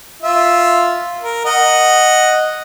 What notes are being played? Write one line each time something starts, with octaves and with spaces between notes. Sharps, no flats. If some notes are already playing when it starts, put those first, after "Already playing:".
F4 E5
A#4
D#5 F#5